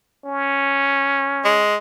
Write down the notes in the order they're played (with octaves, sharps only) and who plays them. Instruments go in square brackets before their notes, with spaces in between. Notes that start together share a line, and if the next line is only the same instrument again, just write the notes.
[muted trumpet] C#4
[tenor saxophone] G#3